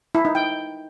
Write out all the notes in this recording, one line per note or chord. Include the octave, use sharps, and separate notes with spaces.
E4
D#4
G5